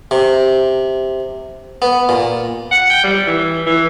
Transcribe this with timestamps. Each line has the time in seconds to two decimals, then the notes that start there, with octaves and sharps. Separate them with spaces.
0.11 C3
1.82 B3
2.09 A#2
2.71 F#5
2.90 G5
3.04 G3
3.27 E3
3.67 E3